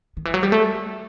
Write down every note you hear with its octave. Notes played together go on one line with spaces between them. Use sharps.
D#3
E3
F#3
G3
A3